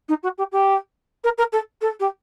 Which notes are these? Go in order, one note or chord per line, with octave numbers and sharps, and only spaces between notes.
D#4
F#4
G4
G4
A#4
A#4
A4
A4
G4